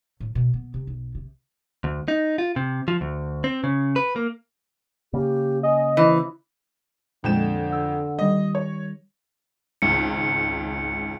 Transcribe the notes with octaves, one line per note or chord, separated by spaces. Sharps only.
A2
B2
B3
C3
B1
C3
D2
D#4
F4
C3
F3
D2
C4
C#3
B4
A#3
C#3 A#3 G4
D#5 G#5
E3 C5
F2 A#2 D3 G#3 G5 E7
F#5 E6
D#3 G3 D#5
C#5
G#1 C#2 C#7